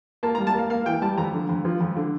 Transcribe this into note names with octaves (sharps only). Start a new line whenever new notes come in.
A#3 A5
G3 A#5
A5
A#3 F5
A#3 F5
E3 G5
G3 A5
F2 A#5
D3
F2
F3
F2
D3